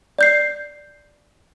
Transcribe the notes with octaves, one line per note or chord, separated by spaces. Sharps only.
D5 G6 C7